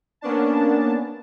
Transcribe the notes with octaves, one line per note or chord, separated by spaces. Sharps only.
A#3 B3 C#4 D4 A5